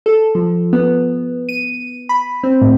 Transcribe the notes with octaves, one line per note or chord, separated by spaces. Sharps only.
A4
F3
B3
D#7
B5
C4
A2